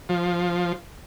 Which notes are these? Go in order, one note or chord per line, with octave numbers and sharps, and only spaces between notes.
F3